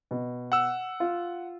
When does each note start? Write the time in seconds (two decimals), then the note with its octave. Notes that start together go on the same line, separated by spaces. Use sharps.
0.11 B2
0.52 F#5 E6
1.00 F4